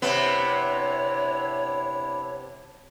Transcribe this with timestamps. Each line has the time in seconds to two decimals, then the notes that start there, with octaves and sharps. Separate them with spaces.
0.02 C3 B3 D4 E4 C#5